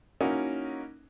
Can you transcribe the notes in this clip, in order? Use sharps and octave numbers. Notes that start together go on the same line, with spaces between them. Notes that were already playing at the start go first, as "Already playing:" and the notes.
A#3 C#4 D#4 E4 F#4 A#4